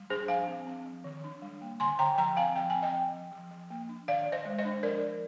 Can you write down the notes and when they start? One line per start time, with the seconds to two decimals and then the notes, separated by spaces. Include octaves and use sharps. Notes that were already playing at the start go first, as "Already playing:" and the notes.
Already playing: G3
0.10 D4 G#4 C5
0.28 F3 F5 G#5
0.47 C4
0.67 C4
0.85 F3
1.04 D#3
1.24 D4
1.42 G3
1.62 A#3
1.80 D3 G#5 C6
1.99 D3 G5 A#5
2.18 F3 G5 A#5
2.37 C4 F5 G#5
2.56 F3 G5
2.70 G#5
2.75 C4
2.83 D#5 G5
2.94 C4
3.14 F3
3.32 F3
3.51 F3
3.70 A#3
3.89 D4
4.08 D#3 D5 F5
4.27 D#3
4.32 C5 D#5
4.45 G#3
4.59 C5 D#5
4.65 D4
4.83 F3 A#4 D5
5.02 F3